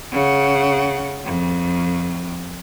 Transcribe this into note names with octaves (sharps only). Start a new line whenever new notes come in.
C#3 F#5
F2